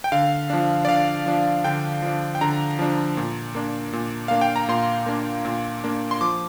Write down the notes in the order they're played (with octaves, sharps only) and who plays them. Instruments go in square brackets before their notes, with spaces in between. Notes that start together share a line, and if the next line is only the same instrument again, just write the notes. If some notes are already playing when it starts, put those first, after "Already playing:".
[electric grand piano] G5
D3 F5
F3 D4
D5
D3 F5
F3 D4
D3 G5
F3 D4
G5
D3 A#5
F3 D4
A#2
A#3 D4
A#2
A#3 D4 F5
G5
A#5
A#2 C6
A#3 D4
A#2
A#3 D4
C6
F3 D6